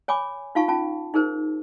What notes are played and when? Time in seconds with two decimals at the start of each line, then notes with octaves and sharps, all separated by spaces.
0.08 C#5 G#5 B5 D6
0.55 D#4 F4 F5 A5 C#6
0.68 C#4 F4 A5
1.14 D#4 G#4 A#4 C5